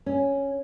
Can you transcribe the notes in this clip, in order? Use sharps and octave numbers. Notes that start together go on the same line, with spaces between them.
C#4